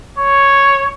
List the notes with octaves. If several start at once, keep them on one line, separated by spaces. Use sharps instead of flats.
C#5